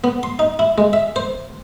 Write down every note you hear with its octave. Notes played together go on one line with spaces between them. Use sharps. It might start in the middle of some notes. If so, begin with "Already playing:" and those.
B3
C6
D#4
E4
G#3
E5
C5